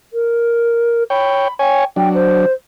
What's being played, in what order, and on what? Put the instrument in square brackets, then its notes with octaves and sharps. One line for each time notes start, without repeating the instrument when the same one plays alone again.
[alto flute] A#4
[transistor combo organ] C#5 G5 [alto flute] B5
[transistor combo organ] C#5 G#5 [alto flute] G5
[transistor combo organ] F#3 D4 [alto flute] G5
[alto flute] C5